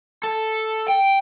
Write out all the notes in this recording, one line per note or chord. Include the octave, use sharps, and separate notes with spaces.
A4
G5